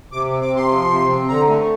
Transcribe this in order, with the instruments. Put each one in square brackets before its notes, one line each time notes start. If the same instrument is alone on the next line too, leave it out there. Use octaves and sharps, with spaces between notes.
[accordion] C3 D6
C4
D6
C3
C6
F3
C3
C4
D3 A#5
A3